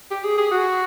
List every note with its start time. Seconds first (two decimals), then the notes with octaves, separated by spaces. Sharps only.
0.11 G4
0.24 G#4
0.38 G#4
0.52 F#4